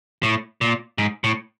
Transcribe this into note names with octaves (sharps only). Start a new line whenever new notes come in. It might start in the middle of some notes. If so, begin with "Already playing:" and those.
A2
A#2
G#2
A2